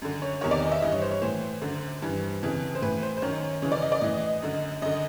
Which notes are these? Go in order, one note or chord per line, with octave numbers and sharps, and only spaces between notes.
F#2 D3
C#5
E2 C3 D#3 C#5
D5
D#5
E5
G2 E3 D#5
C#5
C5
C#5
A2 E3 C5
F#2 D3
G2 E3
F2 C#3 E3
C5
A2 E3 B4
C5
C5
F#2 D#3 C#5
F#2 C#3 E3 C#5
D5
D#5
D5
A2 E3 D#5
F#2 D3
F#2 D3 D#5